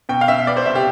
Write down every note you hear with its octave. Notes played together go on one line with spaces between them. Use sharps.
B2 G5
F5
B2 E5
B3 D5
C5
C2 E5
G4